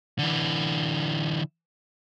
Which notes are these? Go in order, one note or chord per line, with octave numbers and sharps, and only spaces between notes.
D3 E3